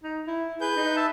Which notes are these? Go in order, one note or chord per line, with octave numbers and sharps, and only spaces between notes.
D#4
E4
G#4 B4 G6
D#4
E5 A5